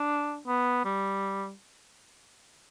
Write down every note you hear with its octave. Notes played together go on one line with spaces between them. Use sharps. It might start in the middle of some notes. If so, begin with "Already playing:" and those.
Already playing: D4
B3
G3